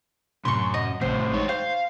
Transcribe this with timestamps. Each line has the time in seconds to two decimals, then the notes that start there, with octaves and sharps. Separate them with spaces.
0.45 F#2 A2 C3 C6 C#6
0.74 D#5
1.01 A1 F2 A2 C3 C5 F#5
1.34 G#3 D#4 G4 C#5
1.49 C5 F5 G5